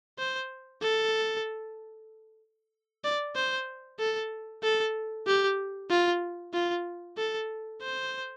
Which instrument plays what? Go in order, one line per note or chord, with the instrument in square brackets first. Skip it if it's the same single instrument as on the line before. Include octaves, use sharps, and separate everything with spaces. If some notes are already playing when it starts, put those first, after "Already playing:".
[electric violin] C5
A4
D5
C5
A4
A4
G4
F4
F4
A4
C5